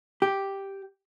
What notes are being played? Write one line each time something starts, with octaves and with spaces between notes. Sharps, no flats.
G4